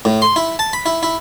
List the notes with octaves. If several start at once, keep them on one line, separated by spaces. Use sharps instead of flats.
A2
C6
E4
A5
B5
E4
E4